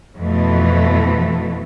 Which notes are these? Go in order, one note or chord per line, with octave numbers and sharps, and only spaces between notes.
F2 B2 E3 A3